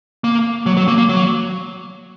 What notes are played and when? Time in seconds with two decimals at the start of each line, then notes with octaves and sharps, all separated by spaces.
0.24 A#3
0.66 F#3
0.77 F#3
0.88 A#3
0.98 A#3
1.09 F#3